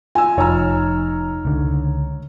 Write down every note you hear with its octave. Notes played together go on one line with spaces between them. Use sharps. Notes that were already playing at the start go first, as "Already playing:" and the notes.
F4 G#5 E6
F1 D#4 C#5 A#5 E6 F6
C#2 D3